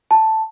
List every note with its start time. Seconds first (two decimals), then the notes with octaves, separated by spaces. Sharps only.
0.11 A5